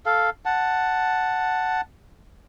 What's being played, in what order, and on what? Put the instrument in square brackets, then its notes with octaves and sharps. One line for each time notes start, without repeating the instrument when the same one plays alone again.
[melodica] A4 F5
F#5 A5